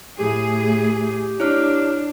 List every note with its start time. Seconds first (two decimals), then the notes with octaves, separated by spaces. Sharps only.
0.19 A2 G4 G#4
1.40 D4 E4 C#5 F6